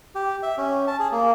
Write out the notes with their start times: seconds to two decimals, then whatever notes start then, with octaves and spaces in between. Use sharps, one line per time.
0.15 G4
0.43 E5
0.58 C#4
0.87 A5
1.00 G#4
1.12 A#3